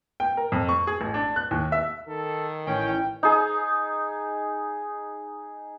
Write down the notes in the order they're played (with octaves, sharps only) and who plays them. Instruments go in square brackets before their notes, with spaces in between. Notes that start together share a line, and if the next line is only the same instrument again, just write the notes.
[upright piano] G5
A#4
F2
C#6
G#4
A1
D4
F#6
D#2
E5
[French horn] D#3 [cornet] A4
[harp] A1 [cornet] C#4 [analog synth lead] G5
[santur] D#4 G#4